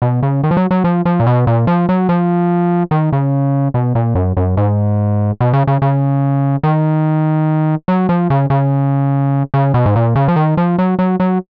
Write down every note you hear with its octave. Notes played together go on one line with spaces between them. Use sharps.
B2
C#3
D#3
F3
F#3
F#3
F3
F3
A#2
B2
A#2
F3
F#3
F3
D#3
C#3
B2
A#2
F#2
F#2
G#2
B2
C#3
C#3
C#3
D#3
F#3
F3
C#3
C#3
C#3
B2
G#2
A#2
C#3
F3
D#3
F3
F#3
F#3
F#3